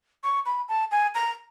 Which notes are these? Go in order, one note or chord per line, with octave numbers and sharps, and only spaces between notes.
C#6
B5
A5
G#5
A#5